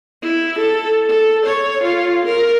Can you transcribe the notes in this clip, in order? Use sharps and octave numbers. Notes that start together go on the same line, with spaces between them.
E4
A4
A4
C#5
F4
A#4